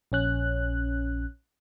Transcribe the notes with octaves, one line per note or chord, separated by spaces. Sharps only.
A#1 C#4 F#6